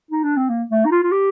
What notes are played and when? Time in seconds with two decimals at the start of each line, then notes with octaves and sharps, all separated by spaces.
0.11 D#4
0.24 D4
0.36 C4
0.49 A#3
0.70 A3
0.86 D#4
0.91 F4
1.03 F4
1.12 G4